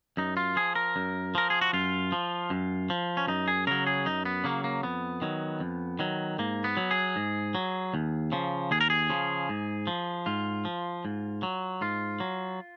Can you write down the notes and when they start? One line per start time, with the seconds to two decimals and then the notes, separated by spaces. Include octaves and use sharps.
0.17 F#2 D#4
0.37 F4
0.56 F3 G#4
0.75 A#4
0.96 F#2
1.35 F3 A#4
1.50 G#4
1.61 F#4
1.73 F#2 F4
2.12 F3
2.50 F#2
2.90 F3
3.17 C#4
3.27 F#2 D#4
3.48 G#4
3.67 C#3 F#3 A#4
3.87 G#4
4.06 F#2 D#4
4.25 B3
4.44 C#3 F#3 A#3
4.64 A#3
4.83 F2 B3
5.22 D#3 F#3
5.60 F2
5.99 D#3 F#3
6.39 G#2 A#3
6.64 B3
6.77 F#3
6.91 G#4
7.16 G#2
7.55 F#3
7.94 D#2
8.32 C#3 F3
8.71 D#2 G#4
8.81 A#4
8.90 G#4
9.10 C#3 F3
9.49 G#2
9.87 F3
10.26 G#2 F4
10.65 F3
11.05 G#2
11.43 F#3
11.81 G#2 F4
12.20 F#3